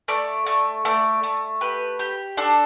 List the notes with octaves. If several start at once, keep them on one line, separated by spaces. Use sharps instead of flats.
A3 D5
A3
A3 D5
A3
G4 B4
G4
D4 A4